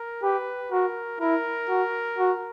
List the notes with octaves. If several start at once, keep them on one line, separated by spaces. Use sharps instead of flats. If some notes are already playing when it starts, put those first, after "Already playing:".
Already playing: A#4
G4 B4
F#4 A#4
E4 A#4
F#4
F#4